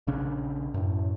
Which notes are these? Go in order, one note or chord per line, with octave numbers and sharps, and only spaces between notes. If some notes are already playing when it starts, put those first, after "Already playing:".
A#1 C#3 C#4 D4
F#2 A2